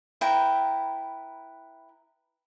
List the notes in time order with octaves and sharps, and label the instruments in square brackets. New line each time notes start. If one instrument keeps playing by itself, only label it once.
[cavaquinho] E4 B4 G5 A#5